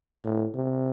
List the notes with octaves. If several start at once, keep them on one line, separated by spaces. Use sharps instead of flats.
A2
C3